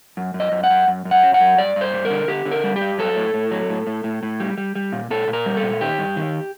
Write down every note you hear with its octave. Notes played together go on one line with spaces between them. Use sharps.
F#2
F#2
D#5
F#2
F#5
F#2
F#2
F#2
F#5
F#3
F#5
F#2
G2 D5
G2 C5
G3
A#4
D3
D3 G4
D3
A#4
G3
G4
G2
F#3 A4
A2
A2
F#3
A2
A2
A2
A2
G3
G3
G3
A#2
A#2 A4
A#2
A#4
G3
A4
A#2
D#3 G4
G2
D#3